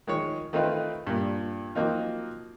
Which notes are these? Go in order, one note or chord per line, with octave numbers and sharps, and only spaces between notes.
D#3 F3 G#3 D#4 C#5
D#3 A3 C4 D#4 F4 B4
G2 A#2
F3 F#3 A#3 C4 D#4 F4